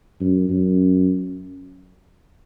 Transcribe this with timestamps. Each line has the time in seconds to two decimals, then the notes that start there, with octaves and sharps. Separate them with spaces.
0.20 F#2
0.49 F#2